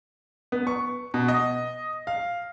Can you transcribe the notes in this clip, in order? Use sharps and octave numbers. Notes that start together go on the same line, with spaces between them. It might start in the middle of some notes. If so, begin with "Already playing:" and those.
B3
C#6
B2
D#5
F5